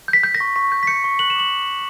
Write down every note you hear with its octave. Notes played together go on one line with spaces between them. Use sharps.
G6
B6
G6
A#6
C#6
C#6 B6
G6
B6
G6 C#7
C#6
F#6 F#7
E7
D6 F#7